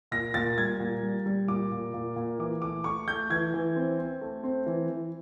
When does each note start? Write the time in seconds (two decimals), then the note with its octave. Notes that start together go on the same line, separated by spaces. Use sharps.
0.11 A#2 A#6
0.34 A#2 A6
0.58 G3 G#6
0.80 A#2
1.03 G3
1.26 G3
1.48 A#2 D6
1.72 A#2
1.94 A#2
2.16 A#2
2.39 E3 D6
2.62 A3 D6
2.84 A3 C#6
3.08 A3 G6
3.30 E3 G#6
3.54 E3
3.76 C4
3.99 C4
4.21 A3
4.43 C4
4.66 E3
4.90 E3